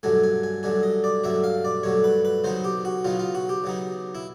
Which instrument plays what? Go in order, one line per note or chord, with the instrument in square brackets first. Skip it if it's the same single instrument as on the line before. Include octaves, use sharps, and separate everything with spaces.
[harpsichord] G2 D3 F#3 A3 G#5
G#5
G#5
G2 D3 F#3 A3 G#5
D#5
D5
G2 D3 F#3 A3 E5
F5
D5
G2 D3 F#3 A3 C#5
B4
B4
C#3 F#3 B3 D#4 C5
G4
F#4
C#3 F#3 B3 D#4 F4
F4
F#4
G4
C#3 F#3 B3 D#4
E4